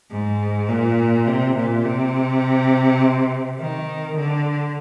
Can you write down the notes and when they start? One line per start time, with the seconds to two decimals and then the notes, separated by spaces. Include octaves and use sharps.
0.11 G#2
0.68 A#2
1.27 C3
1.56 A#2
1.85 C3
3.59 D#3
4.16 D3